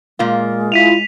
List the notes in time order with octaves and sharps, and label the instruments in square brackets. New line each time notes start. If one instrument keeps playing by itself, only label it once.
[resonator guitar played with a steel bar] A#2 A#3 F4 [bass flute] G#3
[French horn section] E4 F4 [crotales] B6 D#7 F7